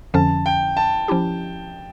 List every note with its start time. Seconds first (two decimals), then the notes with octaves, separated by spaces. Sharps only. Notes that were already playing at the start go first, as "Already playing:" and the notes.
0.14 F2 D3 F3 C#4 A5
0.46 G5
0.77 A5
1.08 F3 C#4 E4 G4